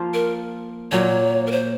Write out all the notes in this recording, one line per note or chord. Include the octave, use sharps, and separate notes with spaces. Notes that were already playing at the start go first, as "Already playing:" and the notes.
Already playing: F3 A#3 F4 C5
A#4
A#2 F#3 A#3 C#5
A#4
C5